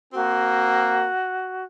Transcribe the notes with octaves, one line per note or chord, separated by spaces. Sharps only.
A#3 C4 F#4